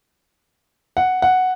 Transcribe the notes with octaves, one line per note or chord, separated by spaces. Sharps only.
F#5
F#5